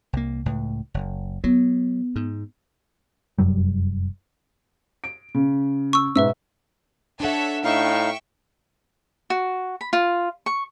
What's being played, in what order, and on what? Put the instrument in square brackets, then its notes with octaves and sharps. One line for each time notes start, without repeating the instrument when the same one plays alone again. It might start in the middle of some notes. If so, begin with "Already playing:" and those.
[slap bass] C2 A#3
C#2 A2
F#1
[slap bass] F#3 [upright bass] B3
[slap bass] G#2
[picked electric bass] F1 F#2 F#3 G3
[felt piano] D7
C#3
[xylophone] C#6 E6
[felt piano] G#2 B2 [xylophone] B4 E5 E6
[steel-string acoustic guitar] D4 F#5 [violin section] A4 C#5 E5
[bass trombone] A2 [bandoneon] D#4 F5 [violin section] E5 G5 C#6
[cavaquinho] F#4
B5
F4
C#6